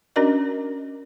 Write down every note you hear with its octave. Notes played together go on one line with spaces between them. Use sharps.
C#4 D4 F#4 A#4 D5 D#5